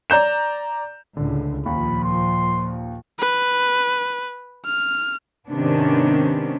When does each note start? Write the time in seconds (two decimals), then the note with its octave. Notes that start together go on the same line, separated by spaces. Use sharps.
0.10 D5 A#5 G6 E7
1.17 C#2 A2 D3
1.66 D#2 A#2 F3 B5
2.04 C6
3.19 B4
4.66 F6
5.49 G#2 C3 D#3 B3 C#4 D4